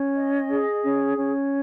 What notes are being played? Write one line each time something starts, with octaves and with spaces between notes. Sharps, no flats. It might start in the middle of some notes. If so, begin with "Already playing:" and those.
Already playing: C#4
D#5
G#4
C#4
C#4